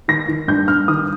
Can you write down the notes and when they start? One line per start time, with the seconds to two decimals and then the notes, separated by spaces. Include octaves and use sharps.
0.08 D#3 A#6
0.29 D#3
0.48 G2 G6
0.68 G2 F6
0.88 D#3 D#6